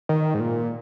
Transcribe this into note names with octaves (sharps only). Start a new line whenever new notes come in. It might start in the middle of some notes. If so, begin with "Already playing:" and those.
D#3
G#2
A#2